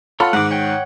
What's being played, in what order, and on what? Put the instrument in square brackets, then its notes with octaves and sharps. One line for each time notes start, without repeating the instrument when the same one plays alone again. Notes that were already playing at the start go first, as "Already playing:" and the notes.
[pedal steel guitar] F4 A4 C#5 [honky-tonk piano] F#5 B5 C6
[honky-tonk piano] G#2 D#3 [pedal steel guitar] F#5 D6
[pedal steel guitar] C#5 F#5 G5